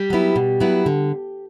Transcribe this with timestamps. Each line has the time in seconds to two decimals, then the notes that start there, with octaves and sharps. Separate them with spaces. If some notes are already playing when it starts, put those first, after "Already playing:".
Already playing: G3 G4
0.10 F#3 B3 E4
0.36 B2
0.60 F#3 B3 E4
0.86 D3